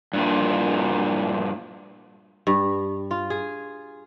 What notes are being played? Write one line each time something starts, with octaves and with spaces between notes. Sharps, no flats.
G2 A#2
G2
F4
G#4